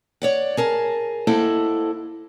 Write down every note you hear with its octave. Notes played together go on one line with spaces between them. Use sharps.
C#5 D5 F#5
G#4 A#4 A5
A#3 E4 A4 C5 D#5 F#5